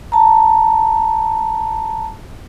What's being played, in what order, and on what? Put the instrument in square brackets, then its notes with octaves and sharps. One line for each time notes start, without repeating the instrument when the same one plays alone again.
[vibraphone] A5 A#5